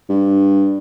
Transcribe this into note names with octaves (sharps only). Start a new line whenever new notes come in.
G2